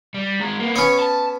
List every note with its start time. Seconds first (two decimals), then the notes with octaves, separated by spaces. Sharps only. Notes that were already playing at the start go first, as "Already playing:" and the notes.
0.14 G3
0.40 G#3 A#4
0.59 A#3 B3
0.76 B3 C#4 C#5
1.00 A5